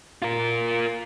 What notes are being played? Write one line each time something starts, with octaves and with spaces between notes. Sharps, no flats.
F4 A#4